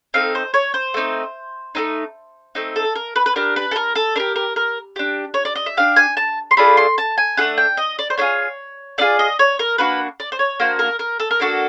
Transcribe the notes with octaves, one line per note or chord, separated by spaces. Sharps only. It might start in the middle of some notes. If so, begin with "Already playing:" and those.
A3 C4 D#4 F5
C5
C#5
C5
A3 C4 D#4
A3 C4 D#4
A3 C4 D#4
A4
A#4
B4
B4
D4 G4 A#4
B4
A4
A#4
A4
D4 G4 A#4
A#4
A#4
D4 G4
C#5
D5
D#5
E5
D4 G4 F5
G#5
A5
C6
A3 D4 F4 G#4 B5
C6
A5
G#5
A3 D4 F4 G#4 F#5
G5
D#5
D5
C5
A3 D4 F4 G#4 C#5
A3 D4 F4 G#4 D5
D#5
C#5
A#4
A#3 D4 F#4 B4
D5
C5
C#5
A#3 D4 F#4 C5
A#4
A#4
A4
A#4
A#3 D4 F#4 A4